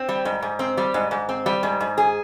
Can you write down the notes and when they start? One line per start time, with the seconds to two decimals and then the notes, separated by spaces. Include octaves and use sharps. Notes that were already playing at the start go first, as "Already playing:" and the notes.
Already playing: C4
0.09 G3
0.25 G#2
0.42 G#2
0.59 C4
0.77 G3
0.94 G#2
1.11 G#2
1.29 C4
1.46 G3
1.63 G#2
1.80 G#2
1.98 G#4